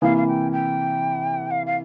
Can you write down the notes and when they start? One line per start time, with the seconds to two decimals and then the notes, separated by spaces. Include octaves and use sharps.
0.02 C3 E3 A#3 E4 F5
0.17 F5
0.27 G5
0.52 G5
1.51 F5
1.66 F5